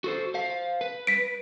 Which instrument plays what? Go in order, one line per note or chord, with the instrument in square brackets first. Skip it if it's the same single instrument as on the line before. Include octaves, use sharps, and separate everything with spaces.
[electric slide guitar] F#4 A4 C5
C5 F5
B4
[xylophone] B6 D7